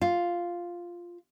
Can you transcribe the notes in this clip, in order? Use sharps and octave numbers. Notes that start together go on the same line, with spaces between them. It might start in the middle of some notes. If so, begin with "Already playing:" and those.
F4